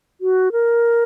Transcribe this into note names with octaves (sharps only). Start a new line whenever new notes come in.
F#4
A#4